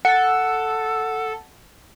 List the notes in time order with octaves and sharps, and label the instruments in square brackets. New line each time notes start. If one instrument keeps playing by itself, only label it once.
[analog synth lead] A4 [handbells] F#5